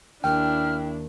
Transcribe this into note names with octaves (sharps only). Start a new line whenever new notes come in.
D#2 D4 E4 G5 F6